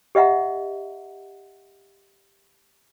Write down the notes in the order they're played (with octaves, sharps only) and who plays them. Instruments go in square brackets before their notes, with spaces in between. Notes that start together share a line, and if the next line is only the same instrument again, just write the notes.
[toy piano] G4 D#5 E5 F#5 A#5